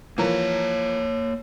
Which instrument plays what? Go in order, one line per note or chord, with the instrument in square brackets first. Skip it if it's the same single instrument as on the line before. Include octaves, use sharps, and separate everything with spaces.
[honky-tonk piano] E3 F3 A#4 [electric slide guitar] A#3 C#5